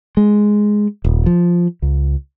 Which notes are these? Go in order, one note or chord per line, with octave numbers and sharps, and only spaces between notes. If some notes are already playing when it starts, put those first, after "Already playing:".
G#3
D#1
F3
C#2